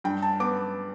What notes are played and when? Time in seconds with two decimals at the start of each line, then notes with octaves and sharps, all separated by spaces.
0.04 G2 G5
0.22 A5
0.40 B3 D6